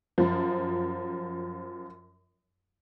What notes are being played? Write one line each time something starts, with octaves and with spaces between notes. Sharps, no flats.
F#2 F3